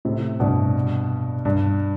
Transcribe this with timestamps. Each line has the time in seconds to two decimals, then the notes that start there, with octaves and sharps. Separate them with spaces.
0.05 A2 C3
0.40 G2 B2
1.45 G2